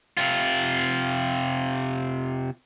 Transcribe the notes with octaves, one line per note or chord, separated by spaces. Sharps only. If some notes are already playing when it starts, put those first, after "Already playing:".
C3 F4